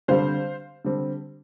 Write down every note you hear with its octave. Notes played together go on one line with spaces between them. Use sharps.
D3 G3 C4 C5 F5
D3 G3 C4